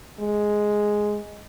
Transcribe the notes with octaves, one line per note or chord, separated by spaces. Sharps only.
G#3